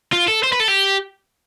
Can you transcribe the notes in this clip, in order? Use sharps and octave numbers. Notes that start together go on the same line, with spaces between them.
F4
A4
C5
B4
A4
G4